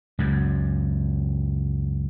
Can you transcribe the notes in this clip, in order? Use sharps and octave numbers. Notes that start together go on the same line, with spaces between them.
C#2 F#2